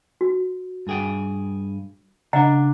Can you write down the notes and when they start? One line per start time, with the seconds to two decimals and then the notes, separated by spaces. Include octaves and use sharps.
0.21 F#4
0.87 G2 G#4 G5
2.33 C#3 D4 D#5 F#5 A#5